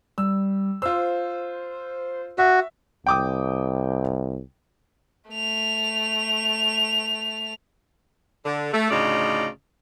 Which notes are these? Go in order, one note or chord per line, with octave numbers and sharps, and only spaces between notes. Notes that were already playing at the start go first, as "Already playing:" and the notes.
G3 E6
F4 C5 E6
F#4 E5
C2 G5 D6 D#6
A3 F7
D3
A3
D2 A2 C#3 D#4 F4 D5